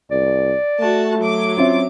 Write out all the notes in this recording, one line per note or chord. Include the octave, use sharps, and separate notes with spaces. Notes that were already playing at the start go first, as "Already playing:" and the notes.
C2 D5
A3 F#4 A5
F#3 D6
C4 C#4 F4 E5